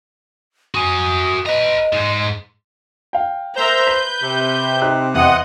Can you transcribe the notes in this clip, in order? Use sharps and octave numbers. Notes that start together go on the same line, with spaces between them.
F#4 G#5 D#6
B4 D#5 A#5
G#2 G#3
F5 G5
A#4 C5 E5 A#5 G6
B4 B6
C3 C4
D#4 G4 F#6
E2 D#5 F#5 C6 D#6